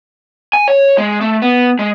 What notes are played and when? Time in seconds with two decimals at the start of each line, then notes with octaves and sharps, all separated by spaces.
0.53 G#5
0.68 C#5
0.98 G#3
1.21 A3
1.42 B3
1.79 G#3